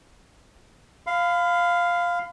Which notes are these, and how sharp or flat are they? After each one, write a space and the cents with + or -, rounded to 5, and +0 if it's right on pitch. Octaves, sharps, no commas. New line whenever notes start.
F5 +0 B5 +40